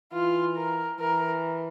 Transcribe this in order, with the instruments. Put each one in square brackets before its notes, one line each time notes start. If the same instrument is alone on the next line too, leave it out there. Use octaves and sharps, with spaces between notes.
[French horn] E3 [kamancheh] F4
[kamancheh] A#4
[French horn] E3 [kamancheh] A#4